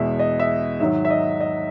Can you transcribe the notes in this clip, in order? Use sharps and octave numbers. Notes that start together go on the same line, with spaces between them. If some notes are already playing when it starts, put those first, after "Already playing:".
Already playing: E2 B2 G#3 E5
D#5
E5
G#2 D#3 F#3 E5
E5
D#5
D#5